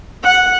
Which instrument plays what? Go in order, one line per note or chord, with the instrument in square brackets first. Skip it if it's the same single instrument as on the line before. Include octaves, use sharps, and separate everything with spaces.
[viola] F#5